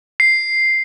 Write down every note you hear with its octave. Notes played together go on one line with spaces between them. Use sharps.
C7